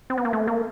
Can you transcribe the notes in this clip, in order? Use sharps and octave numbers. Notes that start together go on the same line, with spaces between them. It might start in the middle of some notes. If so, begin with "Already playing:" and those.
C4
B3
A#3
A3
A#3